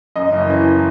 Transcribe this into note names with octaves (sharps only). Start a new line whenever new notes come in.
F#2 D#5
F#1
E3